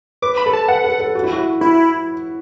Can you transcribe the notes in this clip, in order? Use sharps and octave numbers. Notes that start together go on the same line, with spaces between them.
B4 D6
B5
A4
A5
B4 F#5
A4
A4
F#4
E4
F#4
E4